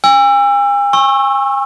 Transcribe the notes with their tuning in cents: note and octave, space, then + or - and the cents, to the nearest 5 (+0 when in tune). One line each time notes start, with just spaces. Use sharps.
G#5 -45 E6 +25
G#5 +10 C#6 -25 E6 +0